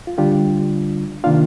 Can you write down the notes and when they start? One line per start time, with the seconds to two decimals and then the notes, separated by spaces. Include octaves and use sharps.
0.07 F4
0.18 D3 G3 D4 F4 G4
1.24 C3 D#3 A#3 D4 F4 F5